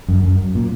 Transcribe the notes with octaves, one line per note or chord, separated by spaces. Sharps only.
F#2
F#2
A#2